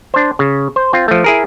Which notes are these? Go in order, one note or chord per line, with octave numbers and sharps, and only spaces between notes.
D4 C5
C#3
C5
C4 F4
F3 A3
E4 G#4 A#4